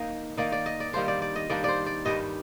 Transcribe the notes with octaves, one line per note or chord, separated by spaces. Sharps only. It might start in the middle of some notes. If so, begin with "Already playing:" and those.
Already playing: D#3 A#3 D#4 D#5
D#3 A#3 D#4 D5
D5
D#5
D5
D#3 G3 A#3 D4 C5
D5
D5
D#5
D#3 G3 A#3 D4 D5
C5 D5
D5
G2 D#3 G3 D4 D#5